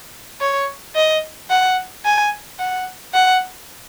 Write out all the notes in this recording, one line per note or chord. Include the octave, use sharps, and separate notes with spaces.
C#5
D#5
F#5
G#5
F#5
F#5